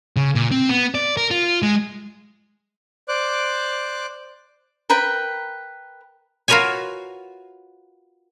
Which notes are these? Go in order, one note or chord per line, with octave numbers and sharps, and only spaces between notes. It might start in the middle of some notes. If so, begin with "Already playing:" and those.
C#3
A#2
C4
B3
D5
A#4
F4
G#3
C5 D5 D6 F#6
A#4 B4 G5 B5
F4 F#4 A#4 B4 C#5 G#5